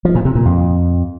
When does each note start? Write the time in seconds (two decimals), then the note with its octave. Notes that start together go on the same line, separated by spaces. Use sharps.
0.05 F3
0.15 A#2
0.25 C3
0.35 A#2
0.45 F2